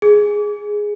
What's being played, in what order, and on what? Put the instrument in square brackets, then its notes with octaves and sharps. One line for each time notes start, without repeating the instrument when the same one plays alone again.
[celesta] G#4